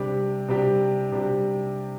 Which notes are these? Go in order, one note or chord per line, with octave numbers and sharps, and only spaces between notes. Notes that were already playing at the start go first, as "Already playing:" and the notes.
Already playing: C3 G3 D4 G4
C3 G3 D4 G4
C3 G3 D4 G4